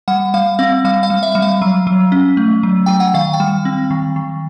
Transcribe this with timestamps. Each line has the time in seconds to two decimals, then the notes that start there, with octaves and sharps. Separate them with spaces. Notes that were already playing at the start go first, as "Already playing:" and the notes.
0.08 G3 F#5
0.34 G3 F5
0.59 C4 F5
0.85 G3 F5
1.03 F5
1.10 G3
1.23 E5
1.35 G3
1.42 F5
1.62 F#3
1.87 F#3
2.12 C#4
2.37 A3
2.63 F#3
2.86 F#3 G5
3.00 F#5
3.14 D#3 F5
3.33 G5
3.40 G3
3.65 C4
3.91 D#3
4.16 D#3